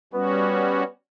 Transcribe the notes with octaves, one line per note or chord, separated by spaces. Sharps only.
G3 B3 C#4 F#4